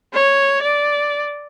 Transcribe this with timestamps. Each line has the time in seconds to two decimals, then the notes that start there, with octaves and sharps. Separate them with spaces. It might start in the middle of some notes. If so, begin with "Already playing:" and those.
0.13 C#5
0.62 D5